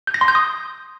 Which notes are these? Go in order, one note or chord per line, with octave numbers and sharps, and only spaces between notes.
G6
A#6
C6
G6
D#6